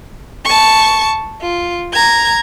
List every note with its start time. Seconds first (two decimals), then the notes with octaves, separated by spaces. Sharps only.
0.45 A5 C#6
1.42 F4
1.94 A#5 G#6